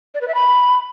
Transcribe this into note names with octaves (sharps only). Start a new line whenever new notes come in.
D5
B4
E5
B5